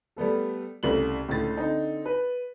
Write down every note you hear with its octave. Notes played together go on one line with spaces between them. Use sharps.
G3 A3 B3 A4
C2 C#3 A3 F#7
C#2 A2 D3 A6
D3 C4 D#4
B4